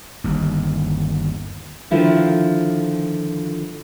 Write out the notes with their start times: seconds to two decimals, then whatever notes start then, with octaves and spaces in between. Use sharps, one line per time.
0.24 G1 D#2
1.91 D3 D#3 F3 E4 F4 A4